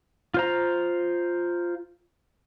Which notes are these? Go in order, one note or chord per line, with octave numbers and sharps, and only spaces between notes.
F4 C5 A#5